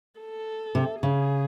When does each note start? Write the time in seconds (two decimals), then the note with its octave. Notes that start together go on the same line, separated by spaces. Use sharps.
0.20 A4
0.75 C3
1.03 C#3 G#4